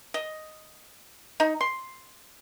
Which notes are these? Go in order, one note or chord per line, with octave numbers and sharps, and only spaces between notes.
D#5
D#4
C6